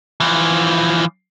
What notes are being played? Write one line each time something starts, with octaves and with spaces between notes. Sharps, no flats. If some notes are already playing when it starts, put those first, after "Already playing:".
E3 F3